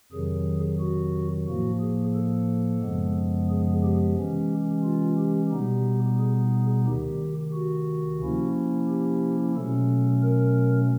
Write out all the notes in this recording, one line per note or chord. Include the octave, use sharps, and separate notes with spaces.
F2 C3 D#3 F#3 G#4
F#4
A2 F3 A#3 F#4
G#4
A4
F#2 C#3 F3 G#3 B3
G#4
G4
C3 E3 G#3 C#4
F4
G4
B2 G3 B3 D#4 G4
G#4
D2 C3 D#3 G4
F#4
C3 F3 A#3 C#4 E4
G4
B2 F#3 A3 C#4 A4
A#4